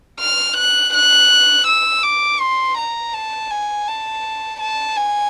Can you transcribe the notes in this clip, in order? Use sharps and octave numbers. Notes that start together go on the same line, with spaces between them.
F6
F#6
F#6
E6
D6
C6
A#5
A5
G#5
A5
A5
G#5